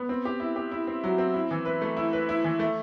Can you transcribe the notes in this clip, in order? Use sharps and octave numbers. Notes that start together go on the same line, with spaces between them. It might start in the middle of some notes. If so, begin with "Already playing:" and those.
Already playing: B3
C4
G4
E4
G4
E4
C4
F#3
C4
E4
E3
B4
A3
E4
B4
E4
E3
A3